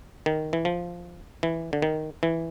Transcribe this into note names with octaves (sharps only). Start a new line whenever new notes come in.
D#3
E3
F3
E3
D3
D#3
E3